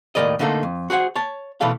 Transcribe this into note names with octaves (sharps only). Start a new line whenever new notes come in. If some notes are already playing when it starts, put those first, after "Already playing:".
D#2 A2 G3 A#4 D5 D#5
D3 A3 A#3 D#4 A4
F2
F#4 G#4 C5 F#5
C#5 A5
B2 E3 A3 A4 F5